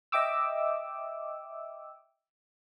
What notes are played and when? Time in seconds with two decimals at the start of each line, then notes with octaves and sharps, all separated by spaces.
0.12 D#5 E5 G5 D6 E6